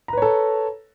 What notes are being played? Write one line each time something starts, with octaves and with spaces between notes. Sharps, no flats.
A4 B4 C#5 A#5